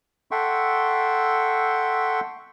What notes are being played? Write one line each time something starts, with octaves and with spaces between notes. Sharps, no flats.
A4 E5 F#5 G5 C6 C#6